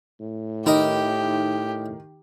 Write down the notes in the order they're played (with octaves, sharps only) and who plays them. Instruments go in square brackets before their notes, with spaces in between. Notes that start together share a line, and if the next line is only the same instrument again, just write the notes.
[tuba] A2
[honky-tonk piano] D#3 [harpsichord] E4 A#4 D#5 [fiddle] G4